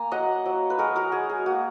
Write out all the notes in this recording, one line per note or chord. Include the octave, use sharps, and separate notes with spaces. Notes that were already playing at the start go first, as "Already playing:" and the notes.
Already playing: A#3 G#5 A#5
F#3 D#5 F#5
F#3
B4
G#3 F#4 A#4
F#4 A#4
G#3 G#4
G#4
A#3 F#4